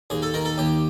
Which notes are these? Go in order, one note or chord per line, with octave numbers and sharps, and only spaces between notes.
D#2 G#4
A4
D#3 A#4
A4
D#2 G4